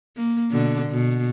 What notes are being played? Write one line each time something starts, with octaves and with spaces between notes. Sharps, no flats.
A#3
B2 D3
B2